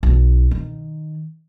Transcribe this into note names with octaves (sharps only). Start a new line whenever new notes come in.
B1
D#3